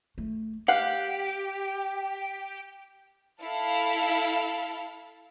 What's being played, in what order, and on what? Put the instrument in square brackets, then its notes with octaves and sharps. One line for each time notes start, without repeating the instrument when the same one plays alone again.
[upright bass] A3
[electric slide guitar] G4 [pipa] F5 F#5
[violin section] E4 A4 F5